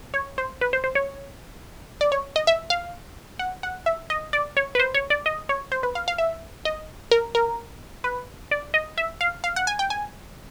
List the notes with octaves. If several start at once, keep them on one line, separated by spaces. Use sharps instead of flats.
C#5
C5
B4
C5
C5
C#5
D5
C#5
D#5
E5
F5
F#5
F#5
E5
D#5
D5
C#5
B4
C5
C#5
D5
D#5
C#5
C5
B4
F5
F5
E5
D#5
A#4
A#4
B4
D5
D#5
E5
F5
F5
F#5
G#5
G5
G#5